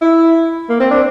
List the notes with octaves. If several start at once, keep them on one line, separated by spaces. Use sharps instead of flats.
E4
A#3
C4
D4